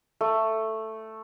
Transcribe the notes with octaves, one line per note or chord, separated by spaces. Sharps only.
A3